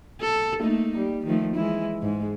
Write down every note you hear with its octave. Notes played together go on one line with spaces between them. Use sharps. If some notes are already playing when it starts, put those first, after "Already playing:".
A4
A3 A#3 D#4
G3
D#3 F3 A3
E3 G#3 E4
G#2 G#3